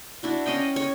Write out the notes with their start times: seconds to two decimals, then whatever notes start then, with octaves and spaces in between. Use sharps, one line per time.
0.23 D4 E4 F#4
0.46 C#4 D#5 F5 G5
0.76 C#5